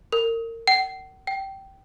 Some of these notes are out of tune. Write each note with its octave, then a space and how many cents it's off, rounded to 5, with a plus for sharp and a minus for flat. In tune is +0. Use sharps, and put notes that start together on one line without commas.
A#4 -30
F#5 +45
G5 -15